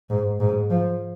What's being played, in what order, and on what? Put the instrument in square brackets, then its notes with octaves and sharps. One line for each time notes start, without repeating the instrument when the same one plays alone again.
[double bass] G#2
G#2
F3